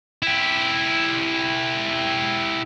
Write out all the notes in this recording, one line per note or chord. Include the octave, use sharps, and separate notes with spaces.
E4 G4